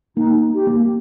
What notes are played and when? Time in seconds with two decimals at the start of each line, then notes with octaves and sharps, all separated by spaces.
0.17 A#3 D#4
0.55 G4
0.67 A#3